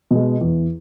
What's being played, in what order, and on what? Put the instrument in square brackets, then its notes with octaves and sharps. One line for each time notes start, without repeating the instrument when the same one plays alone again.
[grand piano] B2 G#3
E2